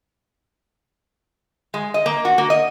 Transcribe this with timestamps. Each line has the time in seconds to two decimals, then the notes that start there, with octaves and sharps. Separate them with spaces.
1.74 G#3
1.94 D#5
2.06 A#3
2.25 F#4
2.38 A#3
2.50 D#5